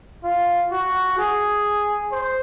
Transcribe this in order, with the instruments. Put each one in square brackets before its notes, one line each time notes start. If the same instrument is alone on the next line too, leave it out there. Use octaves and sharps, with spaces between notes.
[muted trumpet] F4
F#4
G#4
C5